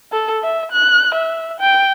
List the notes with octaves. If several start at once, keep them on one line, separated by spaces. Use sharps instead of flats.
A4
E5
F#6
E5
G5